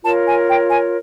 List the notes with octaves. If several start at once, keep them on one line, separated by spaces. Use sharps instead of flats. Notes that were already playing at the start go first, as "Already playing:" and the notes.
F4 A#4 C#5 A5
G#5
G5
G#5